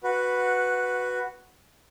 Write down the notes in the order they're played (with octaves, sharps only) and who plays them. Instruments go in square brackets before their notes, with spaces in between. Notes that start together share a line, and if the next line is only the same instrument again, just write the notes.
[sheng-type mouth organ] F#4 B4